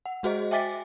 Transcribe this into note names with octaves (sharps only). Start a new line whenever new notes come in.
F#5
G#3 F#4 G#4 C5 D#5
E5 G5 G#5 D6 A6 B6